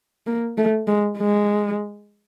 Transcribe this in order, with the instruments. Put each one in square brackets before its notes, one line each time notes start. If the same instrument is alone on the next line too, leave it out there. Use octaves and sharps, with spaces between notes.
[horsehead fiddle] A#3
A3
G#3
G#3